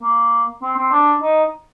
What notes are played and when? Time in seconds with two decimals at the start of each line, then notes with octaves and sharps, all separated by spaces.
0.02 A#3
0.62 C4
0.77 C4
0.92 D4
1.22 D#4